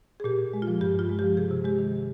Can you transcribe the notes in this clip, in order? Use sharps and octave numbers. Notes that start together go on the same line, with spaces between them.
G#4
A#2 G4
A#2
G#3
F4
F3
G2 G4
G2 F4
G#3
F3 G4
C3 G#4
C3
G#3 G4
D#3